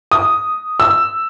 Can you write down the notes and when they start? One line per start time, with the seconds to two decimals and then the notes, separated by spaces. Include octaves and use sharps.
0.11 D#6
0.80 E6